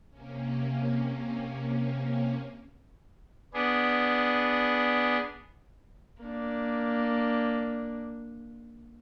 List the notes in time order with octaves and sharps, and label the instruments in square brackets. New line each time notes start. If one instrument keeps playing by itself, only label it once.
[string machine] C3 A#3 C#4
[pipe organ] B3 D4 G#4
[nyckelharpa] A#3 D4